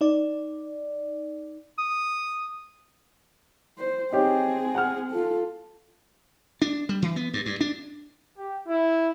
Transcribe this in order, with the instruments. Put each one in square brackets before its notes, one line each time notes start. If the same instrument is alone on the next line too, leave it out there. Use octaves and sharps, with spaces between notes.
[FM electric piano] D#4 D5
[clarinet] D#6
[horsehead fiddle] C5
[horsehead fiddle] C4 G#4 [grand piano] D#4 G4 C#5
[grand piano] F#5 F6
[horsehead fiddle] F4 A4
[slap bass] D4
G3
E3
B3
G2
G2
D4
[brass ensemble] G4
E4